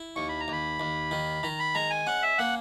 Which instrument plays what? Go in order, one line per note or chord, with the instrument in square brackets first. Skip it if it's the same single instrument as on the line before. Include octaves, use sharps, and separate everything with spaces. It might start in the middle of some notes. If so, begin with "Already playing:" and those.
Already playing: [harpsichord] E4
[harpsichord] D#2 [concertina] C#6
[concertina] B5
A#5
[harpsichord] D#2 [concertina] B5
[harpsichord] D#2
D#3
[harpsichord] D#3 [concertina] A#5
[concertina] B5
[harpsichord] G#3 [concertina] A#5
[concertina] G#5
[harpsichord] C#4 [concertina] F#5
[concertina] E5
[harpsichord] A#3 [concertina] F#5